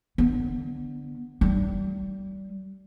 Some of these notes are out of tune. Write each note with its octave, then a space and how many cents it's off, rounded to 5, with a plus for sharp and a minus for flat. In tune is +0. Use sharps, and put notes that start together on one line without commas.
D3 +0 B3 +0
G3 -25 D#4 +15